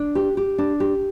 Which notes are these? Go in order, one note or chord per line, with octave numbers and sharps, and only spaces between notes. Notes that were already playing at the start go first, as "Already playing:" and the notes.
Already playing: D4
G4
G4
D4
G4